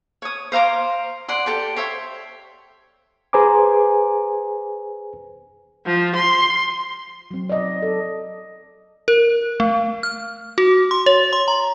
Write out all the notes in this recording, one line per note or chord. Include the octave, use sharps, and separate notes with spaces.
C#5 D#6
C5 F5 A#5 D6
D5 F#5 C6
G4 A4 G5
C5 C#5 E5
G#4 B4 C5 G#5 A#5 D6
F3
C6
F#3 C4
D5 D#5
A4
A#4
A3
F6
F#4
C6
C#5
C6
A#5